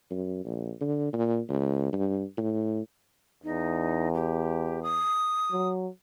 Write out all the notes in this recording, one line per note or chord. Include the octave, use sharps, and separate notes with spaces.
F#2
A#1
D3
A#2
C#2
G2
A2
E2 D#4
G4
D#6
F#3